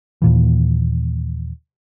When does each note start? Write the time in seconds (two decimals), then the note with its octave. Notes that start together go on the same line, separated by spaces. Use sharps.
0.22 D#2 A#2 E3